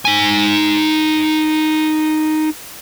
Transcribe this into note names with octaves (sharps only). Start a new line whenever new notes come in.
D#4 G#5